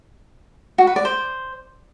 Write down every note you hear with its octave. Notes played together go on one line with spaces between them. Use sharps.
F#4
B4
D5
C5